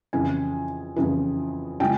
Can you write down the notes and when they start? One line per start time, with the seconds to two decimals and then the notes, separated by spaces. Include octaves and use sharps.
0.13 F2 C#3 E3 G#5
0.96 F2 C#3 E3
1.80 C#3 F3 G#3 C#4 G5